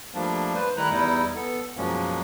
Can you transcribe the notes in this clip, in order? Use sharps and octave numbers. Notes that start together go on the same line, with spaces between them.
F3 G3 A3 A#3 D4
B4 C5
D#3 G3 A3 E4 A#5 F#6
E2 G3 D#4 E4
B3 A4
F#2 B2 F3 G#3 A#3 C#4